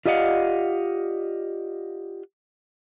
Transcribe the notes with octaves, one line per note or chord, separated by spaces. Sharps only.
F4 G4 D5 D#5 F5 F#5